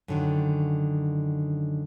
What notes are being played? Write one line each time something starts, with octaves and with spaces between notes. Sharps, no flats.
F#2 D3 D#3